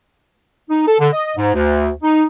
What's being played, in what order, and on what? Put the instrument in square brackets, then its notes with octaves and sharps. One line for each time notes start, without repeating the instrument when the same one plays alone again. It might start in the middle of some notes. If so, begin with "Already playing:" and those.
[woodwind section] D#4
A4
D3
D#5
G#2
D2
D#4